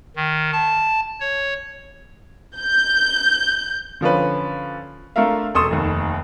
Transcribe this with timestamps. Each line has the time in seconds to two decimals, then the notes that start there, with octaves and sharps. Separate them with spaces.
0.16 D#3
0.53 A5
1.20 C#5
2.58 G6
4.01 D3 F3 C#4 B4
5.16 A3 D4 F4 A#4 E5 F5
5.54 E1 A4 C6 C#6 D#6 E7
5.70 F1 D#2